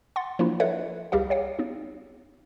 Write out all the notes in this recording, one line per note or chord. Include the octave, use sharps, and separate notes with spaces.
F#5 C6 A6
F3 A#3 D4 E4 F4
A4 B4 C#5 D#5 E5 F#5
C#2 G3 G4 G#4 F5
C#5 F5 F#5
B3 D#4